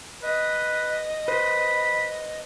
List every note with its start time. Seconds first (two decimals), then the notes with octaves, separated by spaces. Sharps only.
0.23 B4 D#5
1.28 B4 C5 B5